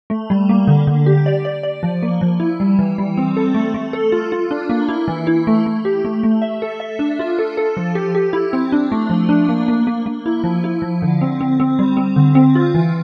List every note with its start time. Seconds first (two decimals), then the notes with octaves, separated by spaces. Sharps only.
0.10 A3
0.30 G3
0.49 A#3
0.67 D3
0.87 D3
1.06 G4
1.26 D5
1.45 D5
1.63 D5
1.83 F3
2.03 A#3
2.21 F3
2.40 E4
2.60 G3
2.79 E3
2.98 G3
3.17 C4
3.37 A4
3.55 A3
3.74 A3
3.93 A4
4.12 F4
4.32 F4
4.51 D4
4.70 A#3
4.89 E4
5.08 E3
5.27 E4
5.47 A3
5.66 A3
5.85 G4
6.05 A3
6.23 A3
6.42 E5
6.62 A4
6.80 E5
6.99 D4
7.19 F4
7.39 A4
7.57 A4
7.77 F3
7.95 G4
8.15 G4
8.33 E4
8.53 C4
8.72 D4
8.92 A3
9.10 F3
9.29 D4
9.49 A#3
9.68 A#3
9.87 A#3
10.06 A#3
10.26 E4
10.44 F3
10.64 E4
10.82 F3
11.02 D3
11.21 C4
11.41 C4
11.60 C4
11.79 G3
11.97 C4
12.16 D3
12.35 C4
12.55 F4
12.75 E3